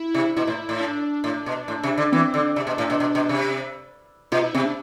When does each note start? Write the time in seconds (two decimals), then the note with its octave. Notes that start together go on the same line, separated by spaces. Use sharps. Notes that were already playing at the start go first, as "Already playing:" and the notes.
Already playing: E4
0.15 C3
0.36 B2 E4
0.47 A2
0.69 A2
0.80 D4
1.24 A2
1.46 B2
1.68 A2
1.84 C3
1.98 D3
2.12 E3 C4
2.34 D3
2.56 C3 D4
2.67 B2
2.78 A2
2.90 B2
3.00 B2
3.15 B2
3.29 C3
4.32 B2 F4
4.43 E4
4.54 C3 C4
4.65 D4